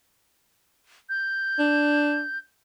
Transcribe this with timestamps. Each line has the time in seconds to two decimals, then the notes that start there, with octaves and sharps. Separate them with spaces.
1.09 G6
1.59 D4